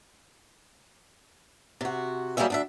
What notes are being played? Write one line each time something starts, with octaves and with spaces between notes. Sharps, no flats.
C3 F#4
F#3 G3 A#3 E4 G#4 E5
D2 D4 E5